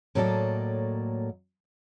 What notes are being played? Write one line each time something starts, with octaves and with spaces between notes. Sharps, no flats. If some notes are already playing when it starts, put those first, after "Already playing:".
A2 F#3 A#3 A4 D5 D#5